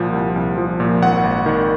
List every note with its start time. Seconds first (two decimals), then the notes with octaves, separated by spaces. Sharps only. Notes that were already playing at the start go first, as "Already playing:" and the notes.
Already playing: C2 A#2 F3
0.13 C2
0.36 C2
0.58 F3
0.80 A#2
1.02 G#1 F#5
1.23 G#1
1.46 D#3